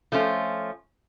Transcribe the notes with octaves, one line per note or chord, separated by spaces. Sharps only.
F3 A3 C#4 F4